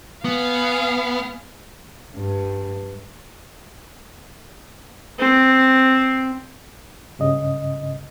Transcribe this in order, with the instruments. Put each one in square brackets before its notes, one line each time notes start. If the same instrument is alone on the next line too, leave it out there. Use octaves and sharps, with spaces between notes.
[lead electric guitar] B3 [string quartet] F5 G#5
[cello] G2
[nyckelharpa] C4
[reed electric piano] G2 C#3 D#5